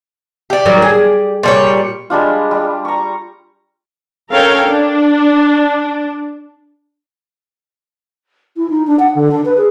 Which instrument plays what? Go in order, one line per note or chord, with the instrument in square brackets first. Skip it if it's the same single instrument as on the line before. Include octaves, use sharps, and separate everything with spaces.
[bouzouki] G4 D5
[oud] D#3 F#3 G3
G#4
[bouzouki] A#2 G3 C#5
[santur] G3 G#3 D4 F4
G3
A#5 C#6
[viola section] C#4 A4 A#4 C#5 F5 G5
D4
[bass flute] E4
D#4
D4
F#5
D3
D4
B4
G#4